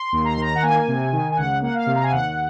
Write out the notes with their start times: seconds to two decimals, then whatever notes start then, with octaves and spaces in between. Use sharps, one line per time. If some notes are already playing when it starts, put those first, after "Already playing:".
Already playing: C6
0.12 D#2
0.25 A#5
0.33 C6
0.37 D#3 A#5
0.55 F#5
0.62 A#3 G#5
0.88 C3
1.12 D#3
1.32 G#5
1.37 C#2 F#5
1.62 A#3 F#5
1.75 F5
1.86 C3
1.96 A#5
2.03 G#5
2.11 D#2 F#5